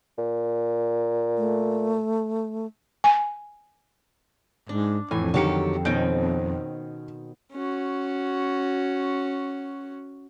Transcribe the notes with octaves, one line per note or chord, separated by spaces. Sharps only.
A#2
A3
G#5
G#2 D4
F2 A2 E3 G#5
D3 D#3 F#3 G4 A4 F5 A5 C#7
B2 D#3 C4 C#4 G6 D7
C#4 F#4